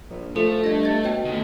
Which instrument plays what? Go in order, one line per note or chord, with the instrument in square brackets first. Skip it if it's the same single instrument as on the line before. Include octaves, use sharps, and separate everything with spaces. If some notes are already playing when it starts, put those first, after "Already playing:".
[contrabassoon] A#1
[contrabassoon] F3 [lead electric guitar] A3 [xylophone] A4
[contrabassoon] G2 [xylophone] D#5 A#6
[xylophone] D#5 A6
[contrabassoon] B2 [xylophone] C#5 D#5 G5
[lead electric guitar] D#3 A3